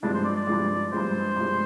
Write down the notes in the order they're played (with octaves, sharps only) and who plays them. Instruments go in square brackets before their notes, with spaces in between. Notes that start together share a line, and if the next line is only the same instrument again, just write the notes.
[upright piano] G2 F3 G#3 [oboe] D4
[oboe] C5
D5
D5
[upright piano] G2 F3 G#3
[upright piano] G2 F3 G#3 [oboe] C5
[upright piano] G2 F3 G#3